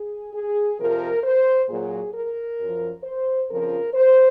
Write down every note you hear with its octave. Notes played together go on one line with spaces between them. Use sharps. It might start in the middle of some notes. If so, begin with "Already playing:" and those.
Already playing: G#4
G#4
F2 C3 F3 A#4
C5
A#2 F#3 G#4
A#4
F#2 F3
C5
F2 C#3 F3 A#4
C5